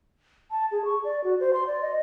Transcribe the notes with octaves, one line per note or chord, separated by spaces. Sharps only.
A5
G#4
C#6
D5
F#4
C5
C6
D5
D#5